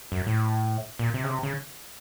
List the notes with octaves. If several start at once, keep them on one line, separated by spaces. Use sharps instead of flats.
F#2
A2
A#2
C3
C#3
C3
C#3